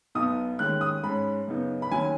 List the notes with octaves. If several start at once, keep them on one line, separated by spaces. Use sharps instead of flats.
B1 B2 B3 D#4 D#6
D#2 D#3 G#3 C#4 F#6
D#6
G#2 G#3 C#4 B5
F#2 C#3 B3 D#4
B5
D#2 D#3 F#3 C#4 G#5